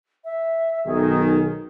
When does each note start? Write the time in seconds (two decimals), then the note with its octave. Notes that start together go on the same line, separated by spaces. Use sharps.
0.25 E5
0.86 B1 D#3 G#4